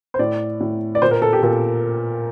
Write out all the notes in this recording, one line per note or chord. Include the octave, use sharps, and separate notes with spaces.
C5
A2 D5
A2
D5
A#2 C5
A#4
A4
G4
A#2 A4